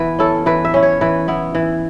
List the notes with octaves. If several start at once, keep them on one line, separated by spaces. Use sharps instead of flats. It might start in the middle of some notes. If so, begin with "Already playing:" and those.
Already playing: E3 B3 B4
C#4 E4 A4
E3 B4
E5
C#4 E4
C#5
E3 B4
B3 E4
E3